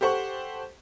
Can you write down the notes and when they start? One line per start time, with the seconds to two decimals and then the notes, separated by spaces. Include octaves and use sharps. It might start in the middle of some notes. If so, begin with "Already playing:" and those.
0.01 G4 A4 C5 F#5 C#6